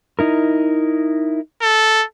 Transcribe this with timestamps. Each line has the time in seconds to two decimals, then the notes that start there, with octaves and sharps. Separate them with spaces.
0.19 D#4 E4 A#4
1.61 A4